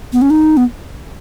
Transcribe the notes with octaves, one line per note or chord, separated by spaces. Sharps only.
B3
C#4
D#4
B3